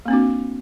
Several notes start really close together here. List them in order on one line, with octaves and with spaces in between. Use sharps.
A#3 C4 D4 F#4